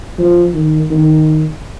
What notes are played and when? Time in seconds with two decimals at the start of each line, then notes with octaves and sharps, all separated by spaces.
0.19 F3
0.54 D#3
0.91 D#3